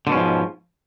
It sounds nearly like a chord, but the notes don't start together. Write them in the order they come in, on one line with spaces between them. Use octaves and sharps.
D3 B2 C#4 G#2 F3